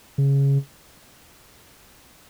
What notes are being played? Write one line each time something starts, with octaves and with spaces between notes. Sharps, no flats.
C#3